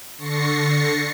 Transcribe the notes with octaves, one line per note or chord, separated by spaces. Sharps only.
D3 C#6 A6 A#6 C7 C#7